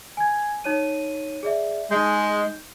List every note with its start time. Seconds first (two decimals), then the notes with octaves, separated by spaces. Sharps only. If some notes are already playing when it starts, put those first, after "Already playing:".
0.17 G#5 G#6
0.64 D#4 C#5 D#7
1.43 G#4 D5 E5
1.91 G#3 D#4 G6